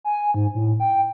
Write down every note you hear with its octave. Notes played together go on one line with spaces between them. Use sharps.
G#5
G#2
A2
G5